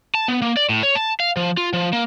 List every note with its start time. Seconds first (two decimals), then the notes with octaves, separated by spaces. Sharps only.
0.15 A5
0.28 B3
0.42 A#3
0.57 D5
0.69 A2
0.83 C#5
0.95 A5
1.20 F5
1.37 F3
1.57 F4
1.73 F3
1.93 A#3